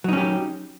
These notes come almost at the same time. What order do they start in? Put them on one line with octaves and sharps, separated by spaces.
F#3 D#4 C#4 G4